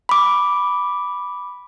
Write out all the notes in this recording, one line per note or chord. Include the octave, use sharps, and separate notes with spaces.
B5 D6